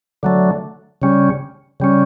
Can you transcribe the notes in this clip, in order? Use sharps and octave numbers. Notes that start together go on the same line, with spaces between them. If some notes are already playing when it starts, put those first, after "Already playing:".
D3 F#3 A3
C#3 G3 C#4
C#3 G3 C#4